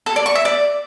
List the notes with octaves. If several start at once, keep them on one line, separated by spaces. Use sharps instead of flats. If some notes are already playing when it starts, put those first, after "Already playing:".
A4
D5
C#6
E5
D5